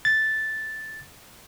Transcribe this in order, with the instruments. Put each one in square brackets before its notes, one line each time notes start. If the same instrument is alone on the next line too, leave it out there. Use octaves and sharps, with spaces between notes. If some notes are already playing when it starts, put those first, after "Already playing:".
[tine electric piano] A6